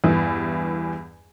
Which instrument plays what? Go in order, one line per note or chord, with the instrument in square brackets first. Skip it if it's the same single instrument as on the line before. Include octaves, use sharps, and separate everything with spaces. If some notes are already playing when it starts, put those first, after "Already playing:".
[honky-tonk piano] E2 G2 E3